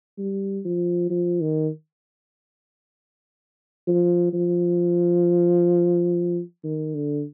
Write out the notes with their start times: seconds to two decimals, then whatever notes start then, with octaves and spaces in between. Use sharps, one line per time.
0.18 G3
0.65 F3
1.10 F3
1.41 D#3
3.87 F3
4.33 F3
6.64 D#3
6.95 D3